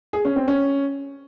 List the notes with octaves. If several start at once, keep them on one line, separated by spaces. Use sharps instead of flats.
G#4
C#4
C4
C#4